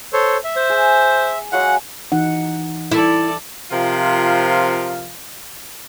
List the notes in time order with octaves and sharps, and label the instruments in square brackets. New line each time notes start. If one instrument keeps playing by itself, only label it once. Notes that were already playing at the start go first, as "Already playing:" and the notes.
[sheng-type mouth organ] A4 C5 C#5
E5
[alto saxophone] C5
[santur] G#4
[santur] F#3 G#3 F5 [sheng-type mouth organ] F#5
[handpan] E3 D#4 F#5
[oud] E4 [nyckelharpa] A4 D5
[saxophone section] C3 F3 F4 A#4 F5